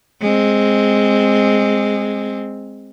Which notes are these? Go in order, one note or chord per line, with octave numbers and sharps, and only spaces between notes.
G#3 C4